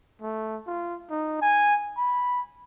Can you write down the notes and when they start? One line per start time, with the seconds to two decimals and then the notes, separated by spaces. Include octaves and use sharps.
0.22 A3
0.67 F4
1.10 D#4
1.41 G#5
1.97 B5